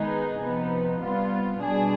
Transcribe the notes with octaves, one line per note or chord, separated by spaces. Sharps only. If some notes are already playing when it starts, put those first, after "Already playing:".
Already playing: D#3 G#3 B3 D#4 G#4
C3 F3 B3 D#4
C3 G3 B3 F4
B2 G3 D4 G#4